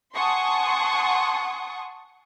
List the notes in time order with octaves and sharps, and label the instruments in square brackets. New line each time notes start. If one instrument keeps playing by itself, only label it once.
[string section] F#5 G#5 A5 C6 C#6 D#6